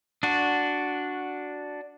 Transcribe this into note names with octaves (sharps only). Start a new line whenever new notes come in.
D4 F#4